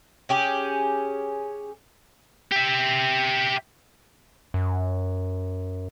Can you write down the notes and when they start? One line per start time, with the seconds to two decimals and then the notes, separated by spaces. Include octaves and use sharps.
0.29 C#4 G4 G#4
2.51 G4 E5
4.54 F#2